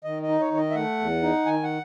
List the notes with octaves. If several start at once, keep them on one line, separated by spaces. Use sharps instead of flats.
D#3 D#5
D#5
D#4
C#5
D#3 C#5
D#5
E5
A3 F#5
E2
D#4
D#3 G#5
F#5